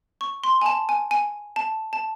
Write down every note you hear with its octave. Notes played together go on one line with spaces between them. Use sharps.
C#6
C6
G#5
A5
G#5
G#5
A5
A5